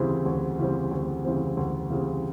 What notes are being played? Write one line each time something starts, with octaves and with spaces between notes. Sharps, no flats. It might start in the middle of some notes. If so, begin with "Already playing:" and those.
Already playing: D2 C#3 E3 G3 C4
D2
C#3 E3 G3 C4
D2
C#3 E3 G3 C4
D2
C#3 E3 G3 C4